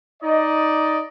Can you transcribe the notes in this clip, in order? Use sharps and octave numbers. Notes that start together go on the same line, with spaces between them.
D#4 D5 D#5